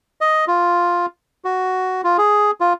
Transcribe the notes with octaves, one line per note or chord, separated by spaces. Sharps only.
D#5
F4
F#4
F4
G#4
F4